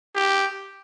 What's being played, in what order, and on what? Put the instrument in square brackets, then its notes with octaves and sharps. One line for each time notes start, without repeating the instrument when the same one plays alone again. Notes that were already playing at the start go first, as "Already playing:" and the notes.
[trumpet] G4